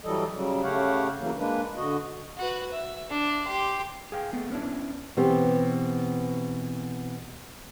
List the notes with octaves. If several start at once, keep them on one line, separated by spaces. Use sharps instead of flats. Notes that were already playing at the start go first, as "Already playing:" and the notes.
E3 F#3 G3 A4 D#5
C#3 F#3 G3
C#3 A3 G4 C#5 F5 F#5
C#3 E3 F#3 A#3
G#3 A#3 D4 B4
D3 F#4 D#5
F#4 B4
E5
D4
G4 C6
G#4 F5 G5
A3 B3 G#4
B3 C#4 D4 E4
B2 E3 B3 C4 G4